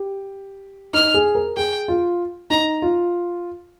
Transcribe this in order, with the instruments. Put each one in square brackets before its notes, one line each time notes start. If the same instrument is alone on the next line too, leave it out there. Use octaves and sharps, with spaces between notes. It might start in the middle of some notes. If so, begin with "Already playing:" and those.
Already playing: [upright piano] G4
[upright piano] D#4 [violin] F6
[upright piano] G#4
A#4
[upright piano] G#4 [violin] G5
[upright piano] F4
[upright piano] D#4 [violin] A#5
[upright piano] F4